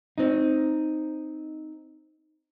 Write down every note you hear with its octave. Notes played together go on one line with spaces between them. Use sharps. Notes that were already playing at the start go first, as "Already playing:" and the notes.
C4 D#4